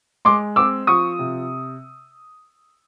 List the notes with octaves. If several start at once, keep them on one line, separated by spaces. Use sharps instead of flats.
G#3 C6 D6
C4 D6 E6
F3 C#6 D#6
C3